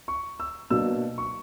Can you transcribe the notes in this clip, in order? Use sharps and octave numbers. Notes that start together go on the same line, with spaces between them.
C#6
E6
B2 F#3 A#3 D4 E6
C#6